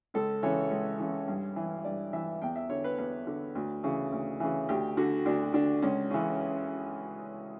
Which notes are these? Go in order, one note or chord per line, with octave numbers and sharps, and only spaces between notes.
C#2 A4
C#3 E3 C#5
C#2
C#3 E3
G2
E3
G2 D5
E3 E5
E2 G5
E5
D3 C#5
B4
E2 B4
D3
D2
C#3 E3
D2
C#3 E3
D2 G4
D3 F#4
D2 D4
D3 D4
C#2 C#4
C#3 E3